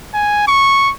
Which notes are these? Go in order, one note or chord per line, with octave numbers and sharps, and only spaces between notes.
G#5
C#6